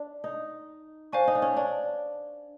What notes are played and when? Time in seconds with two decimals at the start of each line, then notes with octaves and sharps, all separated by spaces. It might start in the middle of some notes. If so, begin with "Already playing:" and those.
Already playing: D4
0.24 D#4
1.13 D4 C5 F5 G#5 C#6
1.28 D#4
1.35 D4
1.42 C#4
1.57 D4